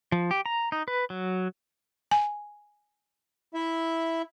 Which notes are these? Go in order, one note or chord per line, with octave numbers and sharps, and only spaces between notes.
F3
G4
A#5
D#4
B4
F#3
G#5
E4 E5